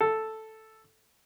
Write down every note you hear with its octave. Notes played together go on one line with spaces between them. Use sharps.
A4